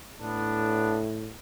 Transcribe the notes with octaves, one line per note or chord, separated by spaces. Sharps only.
A2 B3 D4